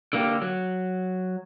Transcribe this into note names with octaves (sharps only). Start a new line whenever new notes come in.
D3 A#3 G4
F#3